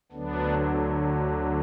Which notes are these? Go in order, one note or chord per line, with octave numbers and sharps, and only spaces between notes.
D2 D3 F#3 B3 D4